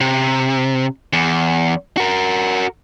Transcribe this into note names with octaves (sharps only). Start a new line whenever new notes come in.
C3
E2
F#4 A#4